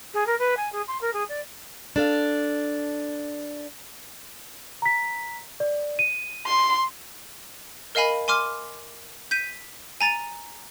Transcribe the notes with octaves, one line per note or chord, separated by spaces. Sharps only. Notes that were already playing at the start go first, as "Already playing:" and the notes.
G#4
A#4
B4
G#5
G#4
C6
A#4
G#4
D5
D4 A4 F5
A#5 B6
D5
D#7
C6
A#4 D#5 F5 G#5 B5
G#5 C6 D6 F6
G6 B6 D#7
G#5 A#5 A6 D#7